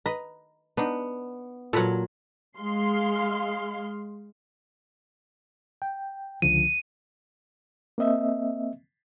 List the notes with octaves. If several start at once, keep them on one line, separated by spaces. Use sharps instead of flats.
B4 D#5 A#5
B3 D4 D#4
A#2 F#3 A4 B4 F#5
G#3 F5 C6
G5
C#2 D3 F3 D#7
A#3 C4 D#5 E5